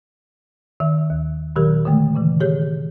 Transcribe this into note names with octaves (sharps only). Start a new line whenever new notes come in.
D#3 E5
D#2
A#2 D#3 F#3 G4 A#4
D3 D#3 G#3 A3
A#2 C#3 E3
D#3 G4 G#4 C#5 G6